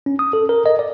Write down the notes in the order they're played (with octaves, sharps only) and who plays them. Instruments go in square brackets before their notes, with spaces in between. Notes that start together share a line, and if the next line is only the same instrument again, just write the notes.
[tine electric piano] C#4
D#6
A4
A#4
D#5
D5